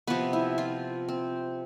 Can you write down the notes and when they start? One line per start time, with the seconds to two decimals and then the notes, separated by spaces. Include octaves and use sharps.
0.07 C3 F3 B3 B4
0.33 E4
0.58 F4
1.09 C4